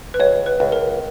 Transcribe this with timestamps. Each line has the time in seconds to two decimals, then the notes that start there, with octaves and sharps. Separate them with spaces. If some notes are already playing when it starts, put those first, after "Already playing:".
0.14 B4
0.20 C#2 C#5
0.46 B4
0.60 C#2
0.72 A#4